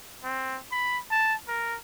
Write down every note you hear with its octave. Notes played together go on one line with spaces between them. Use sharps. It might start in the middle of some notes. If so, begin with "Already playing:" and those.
C4
B5
A5
A#4